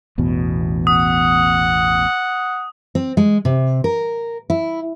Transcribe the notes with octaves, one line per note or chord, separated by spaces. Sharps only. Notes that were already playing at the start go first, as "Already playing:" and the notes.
A1 E2 B2
F#5 D#6
C4
G#3
C3
A#4
E4